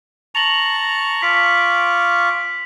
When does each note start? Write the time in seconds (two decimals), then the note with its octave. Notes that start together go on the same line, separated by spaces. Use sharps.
0.35 A5 A#5 C#6 F7 F#7
1.22 F4 C#6 D6 B6